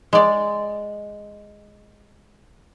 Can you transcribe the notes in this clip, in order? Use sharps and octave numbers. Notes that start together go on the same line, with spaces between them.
G#3 D5